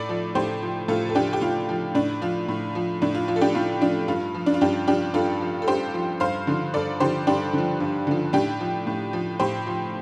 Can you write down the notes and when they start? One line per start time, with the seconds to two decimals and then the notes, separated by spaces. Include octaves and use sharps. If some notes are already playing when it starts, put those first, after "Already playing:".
Already playing: A2 A4 D5
0.09 F3
0.35 A2 G4 C5
0.62 F3
0.88 A2 F4 A4
1.09 A4
1.15 F3 D4 G4
1.33 G4
1.41 A2 F4
1.69 F3
1.95 A2 D4
2.22 F3 F4
2.49 A2
2.75 F3
3.02 A2 D4
3.15 F4
3.28 F3 F4
3.36 A4
3.41 D4 G4
3.55 A2 F4
3.81 F3 D4
4.08 G2 F4
4.35 F3
4.46 D4
4.54 F4
4.61 G2 D4 G4
4.87 F3 D4 G4
5.14 G2 F4 A4
5.41 F3
5.62 A4
5.68 G2 G4 C5
5.94 F3
6.20 G2 C5 F5
6.47 D3 F3
6.74 G2 A4 D5
7.00 D3 F3 G4 C5
7.27 G2 D4 G4
7.53 D3 F3
7.80 G2
8.07 D3 F3
8.33 A2 D4 G4
8.60 F3
8.87 A2
9.13 F3
9.40 A2 G4 C5
9.67 F3